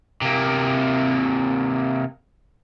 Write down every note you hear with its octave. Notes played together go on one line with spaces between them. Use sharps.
C3 A#3